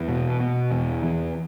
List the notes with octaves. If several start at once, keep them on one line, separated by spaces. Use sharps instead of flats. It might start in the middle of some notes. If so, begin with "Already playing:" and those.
Already playing: E2
B2
B2
E2
E2